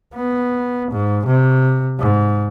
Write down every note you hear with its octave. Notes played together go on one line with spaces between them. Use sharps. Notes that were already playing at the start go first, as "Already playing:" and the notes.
B3
G#2
C3
G#2